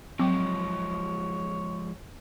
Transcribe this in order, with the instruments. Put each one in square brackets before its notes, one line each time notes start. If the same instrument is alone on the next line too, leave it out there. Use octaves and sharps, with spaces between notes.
[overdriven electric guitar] F3 G#3 [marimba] F#3 G5 D6 [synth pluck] C4 [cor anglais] C#5